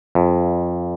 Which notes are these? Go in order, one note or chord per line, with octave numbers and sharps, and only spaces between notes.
F2